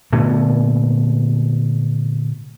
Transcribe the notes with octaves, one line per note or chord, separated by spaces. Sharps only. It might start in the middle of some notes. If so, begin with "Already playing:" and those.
A#2 D3 A3 B3